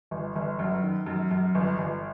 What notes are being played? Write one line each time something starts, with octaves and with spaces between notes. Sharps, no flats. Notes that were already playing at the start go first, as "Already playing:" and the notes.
G1
G1
F#2
D#3
F#2
F#2
G1
G1